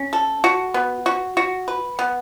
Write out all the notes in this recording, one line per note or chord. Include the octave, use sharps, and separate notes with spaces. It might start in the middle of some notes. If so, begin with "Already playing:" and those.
Already playing: C#4
A4
F#4
B3
F#4
F#4
B4
B3